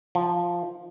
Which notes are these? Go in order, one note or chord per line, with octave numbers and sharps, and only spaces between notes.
F3